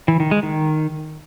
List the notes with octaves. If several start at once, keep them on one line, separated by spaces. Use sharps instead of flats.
E3
D#3
G#3
D#3